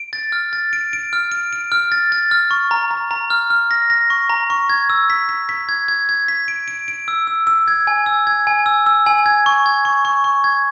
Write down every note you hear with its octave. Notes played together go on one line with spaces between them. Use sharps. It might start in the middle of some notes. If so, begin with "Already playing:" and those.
Already playing: D7
A6
F6
A6
D7
D7
F6
D7
D7
F6
A6
A6
F6
C#6
A#5
A#5
A#5
F6
F6
A#6
A#6
C#6
A#5
C#6
G#6
E6
B6
B6
B6
G#6
G#6
G#6
B6
D7
D7
D7
E6
E6
E6
G#6
G#5
E6
G#6
G#5
E6
E6
G#5
G#6
C#6
G#6
C#6
C#6
C#6
G#6